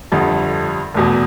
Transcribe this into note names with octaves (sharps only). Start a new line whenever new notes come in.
G1 F2 D3 G3 A4
F1 E2 B2